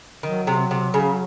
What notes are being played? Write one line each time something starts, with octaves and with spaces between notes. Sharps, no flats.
D#3 F#3
C3
C3
C#3